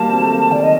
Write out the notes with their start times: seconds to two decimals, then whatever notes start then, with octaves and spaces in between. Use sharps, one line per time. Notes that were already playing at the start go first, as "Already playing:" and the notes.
Already playing: D#3 F#3 G3 A#3 A5
0.09 C4
0.21 A3
0.31 A#3
0.51 D#3 D5
0.63 D#5